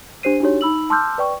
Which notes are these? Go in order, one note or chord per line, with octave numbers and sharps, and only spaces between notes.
D4 G4 C5 C7 D#7
D4 D#4 F#4 G4 C#5
D#4 B5 E6 F#7
A5 C6 D6 E6 F6 G6
B4 D5 G5 C#6